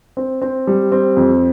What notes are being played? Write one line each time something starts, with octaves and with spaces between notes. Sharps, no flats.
C4
C4
G3
C4
F2